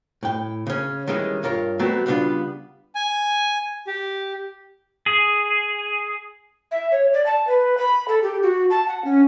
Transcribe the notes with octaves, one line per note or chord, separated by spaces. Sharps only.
A2 G5
C#3 C#4
D#3 E3 G3 G#3 C#4
G2 F4 A#4 C#5
F#3 G3 A3 B3 C4
C#3 G3 B3 C#4 D4 F4
G#5
G4
G#4
E5
C#5
D5
A5
B4
B5
A4
G4
F#4
A5
F#5
C#4